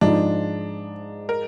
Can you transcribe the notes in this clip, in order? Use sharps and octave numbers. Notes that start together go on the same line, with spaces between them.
G#2 F3 G#3 D4 D#4
A#4